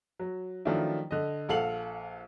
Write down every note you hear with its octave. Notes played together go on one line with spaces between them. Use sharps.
F#3
D#3 F3 F#3 A3 D4 E4
D3 D#5
A#1 A4 F5 F#5 F#7